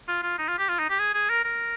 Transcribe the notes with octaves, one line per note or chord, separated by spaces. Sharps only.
F4
F4
D#4
F4
G4
F4
D#4
G4
G#4
G#4
A#4
A#4